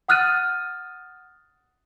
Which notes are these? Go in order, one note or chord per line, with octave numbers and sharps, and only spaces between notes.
F#5 D#6 F6 F#6 A6 D#7